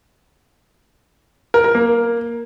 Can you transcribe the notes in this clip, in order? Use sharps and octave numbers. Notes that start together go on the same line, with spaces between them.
A#4
A#4
A#3